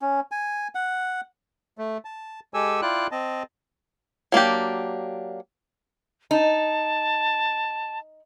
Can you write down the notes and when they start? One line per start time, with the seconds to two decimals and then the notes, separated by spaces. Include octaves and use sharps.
0.02 C#4
0.31 G#5
0.75 F#5
1.78 A3
2.05 A5
2.54 G#3 G4 A4 G#5 E6
2.82 E4 F4 D5 G5 F#6
3.11 C4 D#5 A5
4.32 F#3 A#3 D4 G4
6.31 D#4 A5